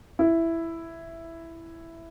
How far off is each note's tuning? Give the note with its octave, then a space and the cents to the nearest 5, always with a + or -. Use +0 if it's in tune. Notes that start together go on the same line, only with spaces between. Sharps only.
E4 +5